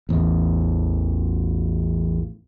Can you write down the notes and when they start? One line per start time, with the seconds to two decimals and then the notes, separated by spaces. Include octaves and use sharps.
0.09 A1 E2